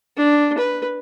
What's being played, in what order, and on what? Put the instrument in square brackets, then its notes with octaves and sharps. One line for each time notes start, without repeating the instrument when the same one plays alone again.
[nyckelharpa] D4
B4